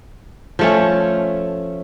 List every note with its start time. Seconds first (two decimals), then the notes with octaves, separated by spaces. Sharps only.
0.59 F3 A3 C#4